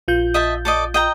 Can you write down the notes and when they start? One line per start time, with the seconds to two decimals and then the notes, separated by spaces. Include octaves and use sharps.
0.08 A#1 F4 G6
0.34 D#5 E5 A5
0.65 A4 D5 D#5
0.94 D#5 G5 A#5